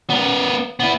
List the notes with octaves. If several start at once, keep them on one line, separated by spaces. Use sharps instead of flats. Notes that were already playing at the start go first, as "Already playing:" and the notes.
B3 A#4
B3 E4